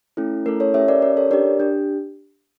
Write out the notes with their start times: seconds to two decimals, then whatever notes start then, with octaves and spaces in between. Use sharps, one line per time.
0.17 A3 C#4 E4 A4
0.46 A3 C#4 E4 A4 A#4
0.60 A4 C#5
0.74 C#4 G4 C#5 E5
0.88 A#4 D5
1.02 C#4 G4 A#4
1.17 A4 C#5
1.31 D4 G4 A#4 D5
1.60 D4 G4